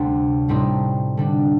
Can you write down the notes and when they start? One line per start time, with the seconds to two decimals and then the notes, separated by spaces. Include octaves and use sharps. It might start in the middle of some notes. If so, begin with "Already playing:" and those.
Already playing: D2 C3 G3 D4
0.48 A2 G3 C4 D#4
1.17 D3 G3 D4